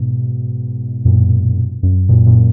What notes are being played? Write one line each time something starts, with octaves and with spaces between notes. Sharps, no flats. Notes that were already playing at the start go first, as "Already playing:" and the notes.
Already playing: G#2 B2
F#2 A#2
F#2
F#2 A#2
F#2 A#2